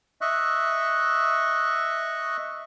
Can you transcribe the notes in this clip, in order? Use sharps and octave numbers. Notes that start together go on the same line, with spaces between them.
D#5 E5 C#6 F#6